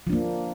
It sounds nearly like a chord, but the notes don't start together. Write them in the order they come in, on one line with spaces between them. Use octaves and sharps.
F3 D4 A#3